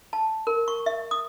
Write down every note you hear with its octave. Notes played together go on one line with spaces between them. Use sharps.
A5
A#4
C#6
E5
D#6